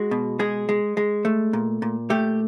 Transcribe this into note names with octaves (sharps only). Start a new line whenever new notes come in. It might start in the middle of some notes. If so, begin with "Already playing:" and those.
Already playing: G#3 F#4
B2
G#3 G#4
G#3
G#3
A3
A#2
A#2
A3 G4